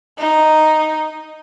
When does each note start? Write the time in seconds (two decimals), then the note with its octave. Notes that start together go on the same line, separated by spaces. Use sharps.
0.19 D#4